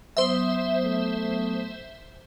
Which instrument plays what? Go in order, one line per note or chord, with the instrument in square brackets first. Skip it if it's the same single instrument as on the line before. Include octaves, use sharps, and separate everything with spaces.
[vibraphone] F#3 B3 D#6 [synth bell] C5 E5
[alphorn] A3